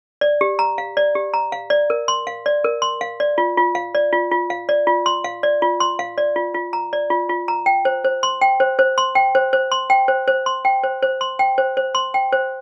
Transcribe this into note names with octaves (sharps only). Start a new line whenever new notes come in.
D5
G4
A#5
F5
D5
G4
A#5
F5
D5
A#4
C6
F5
D5
A#4
C6
F5
D5
F4
F4
F5
D5
F4
F4
F5
D5
F4
C6
F5
D5
F4
C6
F5
D5
F4
F4
A#5
D5
F4
F4
A#5
G5
C5
C5
C6
G5
C5
C5
C6
G5
C5
C5
C6
G5
C5
C5
C6
G5
C5
C5
C6
G5
C5
C5
C6
G5
C5